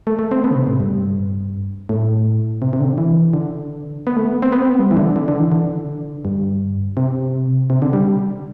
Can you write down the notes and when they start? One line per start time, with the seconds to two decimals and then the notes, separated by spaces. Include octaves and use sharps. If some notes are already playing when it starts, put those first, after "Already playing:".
0.07 A3
0.19 A3
0.31 C4
0.44 B3
0.51 D3
0.55 C3
0.67 A2
0.80 G2
1.89 A2
2.62 C3
2.73 C3
2.80 D3
2.98 E3
3.33 D3
4.07 B3
4.16 A3
4.26 B3
4.42 C4
4.52 B3
4.61 C4
4.70 B3
4.79 G3
4.91 E3
4.97 D3
5.16 D3
5.28 D3
5.40 E3
5.52 D3
6.25 G2
6.97 C3
7.70 C3
7.82 D3
7.93 G3